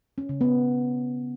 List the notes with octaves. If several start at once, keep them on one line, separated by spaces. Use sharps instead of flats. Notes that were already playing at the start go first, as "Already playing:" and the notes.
C#4
C#3
B3